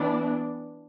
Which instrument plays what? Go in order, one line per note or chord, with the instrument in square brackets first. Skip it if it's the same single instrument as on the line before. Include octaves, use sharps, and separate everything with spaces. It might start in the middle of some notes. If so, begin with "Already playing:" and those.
Already playing: [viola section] E3 B3 D4